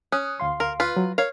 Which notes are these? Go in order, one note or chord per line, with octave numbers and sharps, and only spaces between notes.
C#4 D#6 F#6
D2 F5 C6
A#4
F4 B4
F#3
A#4 C#5 F5